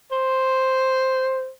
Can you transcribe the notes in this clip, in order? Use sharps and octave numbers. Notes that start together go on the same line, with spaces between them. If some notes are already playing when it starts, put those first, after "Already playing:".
C5